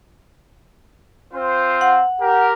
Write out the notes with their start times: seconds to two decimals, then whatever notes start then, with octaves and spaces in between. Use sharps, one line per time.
1.34 C4 F4 C5
1.81 F#5
2.21 G4 A#4